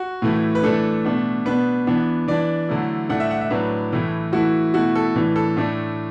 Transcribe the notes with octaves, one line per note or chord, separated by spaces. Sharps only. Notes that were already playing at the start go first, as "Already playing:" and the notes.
Already playing: F#4
A2 E3 A3 E4
B4
E3 A3 D4 A4
B2 A3 D4
B2 B3 D4 B4
E3 B3 D4
E3 D4 D5
D3 F#3 A3 E4
A2 A3 D4 F#5
E5
F#5
E5
A2 F#3 D4 B4
A2 E3 A3 E4
E3 A3 E4 F#4
B2 A3 E4 F#4
A4
A2 E3 D4
A4
A2 A3 D4